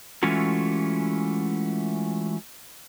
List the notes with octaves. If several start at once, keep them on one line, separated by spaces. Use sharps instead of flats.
E3 G#3 A3 C#4 F4 F#4